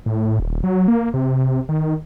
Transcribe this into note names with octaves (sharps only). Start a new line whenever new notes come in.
A2
D#1
F#3
A#3
C3
D#3